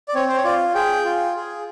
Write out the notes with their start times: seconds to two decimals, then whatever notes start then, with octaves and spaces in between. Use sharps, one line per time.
0.08 D5
0.15 C4 C#5
0.28 C5
0.37 C#5
0.44 F4 D5
0.75 G#4 G5
1.05 F4
1.35 G#4